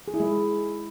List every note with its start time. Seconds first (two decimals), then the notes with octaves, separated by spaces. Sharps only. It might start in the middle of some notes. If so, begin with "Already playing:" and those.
0.08 G#4
0.14 E4
0.20 G#3